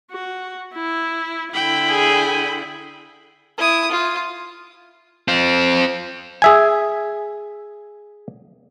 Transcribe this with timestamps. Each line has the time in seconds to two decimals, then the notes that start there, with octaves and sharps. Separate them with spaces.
0.11 F#4
0.74 E4
1.54 D3 E4 G5 B5
1.89 G#4
3.58 E4 D#6
3.91 F4
5.28 C4 F4
6.42 G#4 E5 G#5